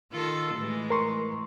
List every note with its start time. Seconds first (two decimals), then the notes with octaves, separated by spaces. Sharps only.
0.12 D#3 F4 A4
0.55 A2 E3 G#3
0.90 A#4 C6 C#6